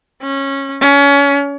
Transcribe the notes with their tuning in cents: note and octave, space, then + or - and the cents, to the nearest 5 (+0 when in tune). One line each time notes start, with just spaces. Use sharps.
C#4 -15
C#4 +30